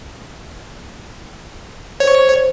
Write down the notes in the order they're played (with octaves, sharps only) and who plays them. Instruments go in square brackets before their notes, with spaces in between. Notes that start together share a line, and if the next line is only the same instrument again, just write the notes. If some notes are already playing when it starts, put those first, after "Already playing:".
[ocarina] C5 [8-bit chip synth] C#5